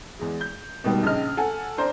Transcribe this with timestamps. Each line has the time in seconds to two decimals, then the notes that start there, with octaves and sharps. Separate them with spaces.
0.19 E2 G#3
0.41 G6
0.84 B2 D#3 G3
1.03 A#1 C#3 D#5 F6
1.37 A4 F#5 G#5
1.78 D4 C5 A#5